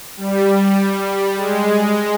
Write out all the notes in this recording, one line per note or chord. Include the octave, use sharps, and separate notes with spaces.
G3
G#3